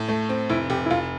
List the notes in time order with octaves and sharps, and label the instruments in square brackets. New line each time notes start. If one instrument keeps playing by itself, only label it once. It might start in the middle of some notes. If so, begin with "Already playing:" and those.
Already playing: [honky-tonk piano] A2
A3
C4
[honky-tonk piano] F1 [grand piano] E4
[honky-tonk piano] F1 [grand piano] G4
[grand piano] E4
[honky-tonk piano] F1 [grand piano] F4